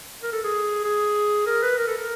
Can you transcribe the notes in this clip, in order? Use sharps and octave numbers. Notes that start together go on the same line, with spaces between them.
A#4
A4
G#4
G#4
A#4
B4
A#4
A4
A#4